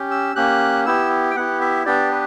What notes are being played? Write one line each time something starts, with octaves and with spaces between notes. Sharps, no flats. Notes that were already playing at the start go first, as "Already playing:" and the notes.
Already playing: C#4 G4
E6
A#3 C#4 G4 F#6
B3 E4 G4 E6
G5
B3 E4 G4 F#5
E5
B3 D4 G4 D5
B4